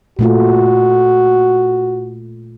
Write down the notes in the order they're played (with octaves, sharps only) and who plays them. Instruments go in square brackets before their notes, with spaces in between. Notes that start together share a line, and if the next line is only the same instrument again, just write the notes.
[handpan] A#2 A3 F4 [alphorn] F#4